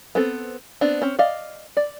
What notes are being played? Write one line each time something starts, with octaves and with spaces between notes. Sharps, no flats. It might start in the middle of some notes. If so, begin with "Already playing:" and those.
B3 C4 A4
B3 C4 D4
C4 C#4
D5 D#5 F5
D5